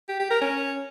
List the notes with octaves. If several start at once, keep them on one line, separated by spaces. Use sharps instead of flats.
G4
G4
A#4
C#4